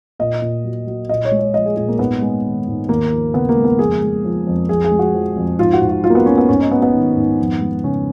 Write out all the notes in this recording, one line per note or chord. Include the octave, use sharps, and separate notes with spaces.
A#2 D#5
A#2
F#3
F#3
A#2 D#5
C#5
G#3
C#5
F3 D#5
G#4
A#2 G#4
A#3
G#2 B3
G#3
D#3
G#2
D#2 A#3
F3
C#3 B3
A#3
G#3
B3
F2 G#4
G#3
F3
F2
F2 G#4
G#4
G#3
F#4
F3
F2
G#2 F4
F#4
G#2
F#4
F#3 F4
A#3
B3
F#3 C#4
B3
G#2 C#4
D#4
F#3 B3
B3
D#3
G#2
F2
G#3
C#3 C#4